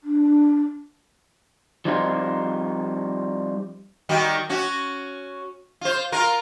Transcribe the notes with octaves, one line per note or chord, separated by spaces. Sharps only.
D4
F3 G3 C4 D#4 F4
D#3 G3 F#4
C#4 F#4
F4 C5
F4 A#4